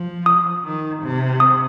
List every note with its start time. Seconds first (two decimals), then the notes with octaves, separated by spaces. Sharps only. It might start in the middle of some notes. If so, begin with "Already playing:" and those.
Already playing: F3
0.26 D#6
0.65 D#3
1.03 C3
1.40 D#6